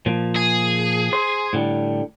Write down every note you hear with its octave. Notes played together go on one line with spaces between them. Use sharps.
A#2 F3
G#4
C5
A2 D3 G3